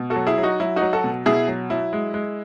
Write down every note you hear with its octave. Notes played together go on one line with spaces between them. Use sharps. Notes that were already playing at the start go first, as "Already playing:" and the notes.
Already playing: B2
F#4 A4
F#3
E4 G#4
F#3
D#4 F#4
F#3 E4
D#4 F#4
F#3
F#4 A4
B2
B2 E4 G#4
F#3
F#3 E4
G#3
G#3